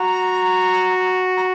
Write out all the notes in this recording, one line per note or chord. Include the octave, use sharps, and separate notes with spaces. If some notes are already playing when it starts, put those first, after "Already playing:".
Already playing: F#4 A#5
A#5